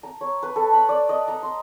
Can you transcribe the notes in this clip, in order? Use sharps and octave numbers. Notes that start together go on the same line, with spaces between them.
A#5
C#5
B4
A4
B5
D5
D#5
A#5
C6